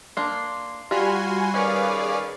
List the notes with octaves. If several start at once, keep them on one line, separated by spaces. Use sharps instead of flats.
A#3 D4 C6
G3 F4 F#4 G#5 B5 C6 F6
D#3 C#4 G#4 B4 D5 F5 G#5